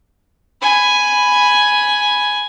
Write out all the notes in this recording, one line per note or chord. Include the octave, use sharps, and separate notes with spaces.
G#5 B5